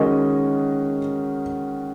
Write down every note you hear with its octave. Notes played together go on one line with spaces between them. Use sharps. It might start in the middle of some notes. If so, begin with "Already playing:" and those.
Already playing: D#3 G#3 C#4 F#4 A#4 D#5